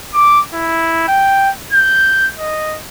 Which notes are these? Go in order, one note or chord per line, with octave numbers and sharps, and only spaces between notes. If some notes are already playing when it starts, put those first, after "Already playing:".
D6
E4
G5
G6
D#5